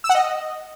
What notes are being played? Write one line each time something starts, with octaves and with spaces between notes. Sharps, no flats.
E6
F#5
D#5